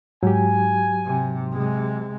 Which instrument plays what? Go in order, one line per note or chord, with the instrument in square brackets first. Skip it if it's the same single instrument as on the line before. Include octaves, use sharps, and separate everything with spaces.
[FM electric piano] G#2 [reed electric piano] F#3 G4 [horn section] G#5
[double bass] C3
C3 G#3